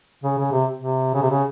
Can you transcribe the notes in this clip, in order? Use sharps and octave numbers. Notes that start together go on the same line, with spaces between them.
C#3
C#3
C3
C3
C#3
C3
C#3